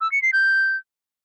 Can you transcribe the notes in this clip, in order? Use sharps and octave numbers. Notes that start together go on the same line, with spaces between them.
E6
C#7
C7
G6